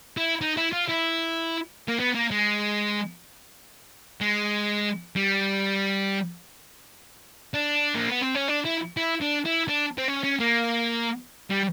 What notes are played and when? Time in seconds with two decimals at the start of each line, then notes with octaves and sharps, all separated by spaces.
0.17 E4
0.41 D#4
0.57 E4
0.72 F4
0.88 E4
1.88 A#3
2.00 B3
2.15 A#3
2.31 G#3
4.21 G#3
5.16 G3
7.54 D4
7.96 A#3
8.09 B3
8.23 C4
8.36 C#4
8.49 D4
8.66 E4
8.97 E4
9.21 D4
9.45 E4
9.68 D4
9.98 C4
10.08 C#4
10.23 C#4
10.40 A#3
11.51 G3